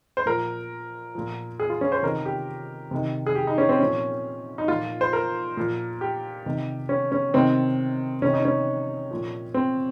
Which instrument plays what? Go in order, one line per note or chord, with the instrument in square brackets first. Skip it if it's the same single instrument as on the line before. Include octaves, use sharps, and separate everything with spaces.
[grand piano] C5
A#2 F3 A#4
A#2 F3
G#4
F4
C#4
C5
C3 D#3 A#4
G4
C3 D#3
G#4
G4
D#4
C#4
C4
A#2 F3 C#4
D#4
A#2 F3 F4
C5
A#4
A#2 F3
G4
C3 D#3
C#4
C#4
C3 D#3 C4
C3 D#3 C#4
D#4
C#4
A#2 F3
C4